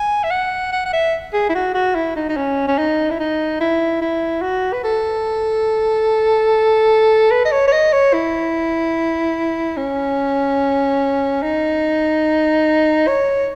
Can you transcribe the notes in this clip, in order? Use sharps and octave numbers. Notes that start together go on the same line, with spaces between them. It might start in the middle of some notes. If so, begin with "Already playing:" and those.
Already playing: G#5
E5
F#5
F#5
F#5
E5
G#4
E4
F#4
F#4
E4
D#4
D#4
C#4
C#4
D#4
E4
D#4
E4
E4
F#4
B4
A4
B4
D#5
C#5
C#5
D#5
C#5
E4
C#4
D#4
C#5